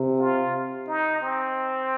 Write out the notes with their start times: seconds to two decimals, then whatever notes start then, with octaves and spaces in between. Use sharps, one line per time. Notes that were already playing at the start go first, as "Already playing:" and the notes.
Already playing: C3
0.19 F4
0.87 D#4
1.22 C4